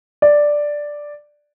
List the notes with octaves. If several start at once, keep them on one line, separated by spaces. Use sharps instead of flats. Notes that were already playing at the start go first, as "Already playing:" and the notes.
D5